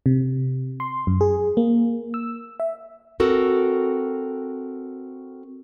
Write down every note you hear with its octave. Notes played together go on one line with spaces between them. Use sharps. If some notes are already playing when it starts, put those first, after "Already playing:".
C3
C6
F#2
G#4
A#3
E6
E5
C4 F#4 A4 A#4